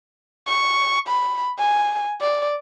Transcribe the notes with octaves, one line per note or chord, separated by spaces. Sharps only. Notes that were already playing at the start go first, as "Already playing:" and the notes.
C#6
B5
G#5
D5